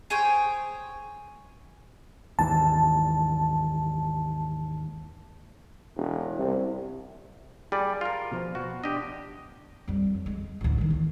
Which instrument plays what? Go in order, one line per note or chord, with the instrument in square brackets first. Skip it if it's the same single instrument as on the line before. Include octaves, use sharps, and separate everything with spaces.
[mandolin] G#4 C5 C#5 G5
[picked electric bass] D#2 G#2 E3 [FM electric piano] A5
[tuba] E1
C2
[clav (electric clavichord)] G3 D5 [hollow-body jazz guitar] G#4
[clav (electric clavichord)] F4 A#4
[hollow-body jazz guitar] B2 F3
[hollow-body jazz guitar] B2 [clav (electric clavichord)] F#4
[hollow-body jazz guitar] D4 [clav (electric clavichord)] G4 D#5
[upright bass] F2 G3
F#3
G#3
A1 D2
E1 D#3
A#3